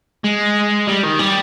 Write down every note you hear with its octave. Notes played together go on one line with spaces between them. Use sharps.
G#3
G3
D#3
G3